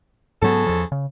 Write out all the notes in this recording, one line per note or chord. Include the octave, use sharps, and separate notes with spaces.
G#2 C#3 F#3 B3 A4
E2 F3
C#3